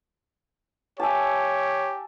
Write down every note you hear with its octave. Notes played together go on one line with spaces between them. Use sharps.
G4 C#5 E5 G#5 A5